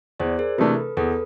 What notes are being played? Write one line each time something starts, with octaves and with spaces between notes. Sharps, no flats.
E2 C5 D5
G#4 A#4
C3 E3 A3 D4 A4 B4
E2 A4 B4